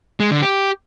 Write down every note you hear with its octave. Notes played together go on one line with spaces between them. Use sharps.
G#3
D3
G4